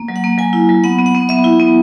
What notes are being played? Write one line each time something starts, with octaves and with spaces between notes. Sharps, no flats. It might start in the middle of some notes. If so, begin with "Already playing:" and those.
Already playing: A#3
F#3
F#5
A#3
F#3 G#5
E4
F#3
B3 F#5
B3
F#5
B3
B3 E5
E4
B3